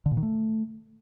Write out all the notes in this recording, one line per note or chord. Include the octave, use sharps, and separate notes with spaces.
D3
A#2
D#3
A3